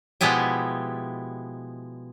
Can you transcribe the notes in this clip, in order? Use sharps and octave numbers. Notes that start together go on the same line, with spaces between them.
B2 F3 G#3 B3 E4 G4